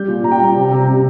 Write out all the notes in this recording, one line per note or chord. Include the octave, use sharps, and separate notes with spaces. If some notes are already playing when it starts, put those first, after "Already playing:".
Already playing: G3 G6
A#2
A#2 A#5
G5
G3 A#5
C3
C3
C3